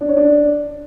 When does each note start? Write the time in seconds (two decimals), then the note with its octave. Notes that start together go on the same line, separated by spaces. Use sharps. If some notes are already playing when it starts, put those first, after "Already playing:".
0.01 D4
0.09 C#5
0.17 D4